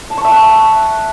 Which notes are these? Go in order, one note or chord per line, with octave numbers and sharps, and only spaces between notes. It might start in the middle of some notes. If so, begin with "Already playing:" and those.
A5
C#6
E5
F#5